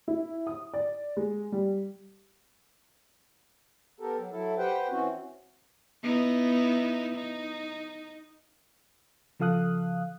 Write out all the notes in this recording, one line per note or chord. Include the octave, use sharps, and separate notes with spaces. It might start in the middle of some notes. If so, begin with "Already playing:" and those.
E4
D#6
D5
G#3
G3
B3 G4 A4 A#4
F#3
F#3 E4 A4
G4 B4 C5 F#5 G5
E3 C4 C#4 F#4
B3 D#4 E4
D#4
C#3 F3 A4 F5 D#6 F#6